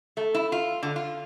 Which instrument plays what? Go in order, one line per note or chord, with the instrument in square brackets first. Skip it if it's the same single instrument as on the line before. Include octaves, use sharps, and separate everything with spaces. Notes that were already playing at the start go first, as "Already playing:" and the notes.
[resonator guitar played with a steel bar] A3
E4
F4
D3
F4